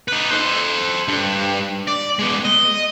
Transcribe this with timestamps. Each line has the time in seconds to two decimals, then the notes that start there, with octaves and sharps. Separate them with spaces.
0.08 D#4 B4
0.31 A4 C5
1.08 G2
1.88 D5
2.19 G#3 B3
2.45 D#5